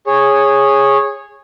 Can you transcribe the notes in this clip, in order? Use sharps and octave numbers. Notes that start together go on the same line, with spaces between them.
G#4 C#5